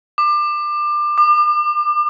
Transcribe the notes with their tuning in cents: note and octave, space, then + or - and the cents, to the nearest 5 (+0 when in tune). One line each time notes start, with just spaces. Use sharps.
D6 +25
D6 +40